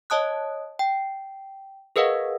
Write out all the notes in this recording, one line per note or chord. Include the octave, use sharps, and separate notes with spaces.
C#5 D#5 A5 D#6 F#6
G5
G#4 A#4 B4 D#5 F5 F#5